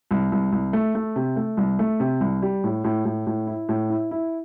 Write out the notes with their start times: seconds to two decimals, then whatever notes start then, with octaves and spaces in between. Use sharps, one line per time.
0.11 C2
0.32 C2
0.52 C2
0.73 A3
0.95 A3
1.16 C3
1.36 A3
1.57 C2
1.79 A3
2.00 C3
2.21 C2
2.42 G3
2.64 A2
2.84 A2
3.05 A2
3.27 A2
3.47 E4
3.69 A2
3.90 E4
4.11 E4